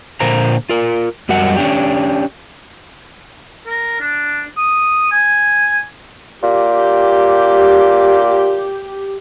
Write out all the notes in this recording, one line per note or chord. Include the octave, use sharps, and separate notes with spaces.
A#2 D3 A#4 C5 A#5
F4 A#4
F#2 G3 F#4 A#4 D#5 F#5
C#4 D4 G4
A#4
D4
D#6
G#5
A#2 G4